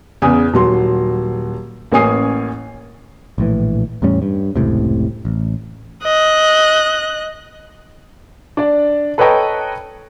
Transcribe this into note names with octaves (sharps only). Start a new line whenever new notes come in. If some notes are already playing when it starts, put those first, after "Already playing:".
E2 C#3 G#5 D#6
D#1 F#3 C6
A1 A#3 C#4 G#5 D#6 C7
A#1 A2 E3
E2 A2 G3 C#4
G2
F1 C#2 A2 C3
A1
D#5 F#6
D4 D5
A4 B4 C#5 D#5 G5 A#5